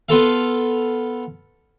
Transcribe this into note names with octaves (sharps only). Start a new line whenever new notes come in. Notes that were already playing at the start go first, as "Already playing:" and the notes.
B3 F4 A4 F5